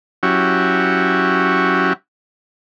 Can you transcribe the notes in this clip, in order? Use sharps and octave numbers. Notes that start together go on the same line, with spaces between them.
F#3 C#4 E4 F#4 G4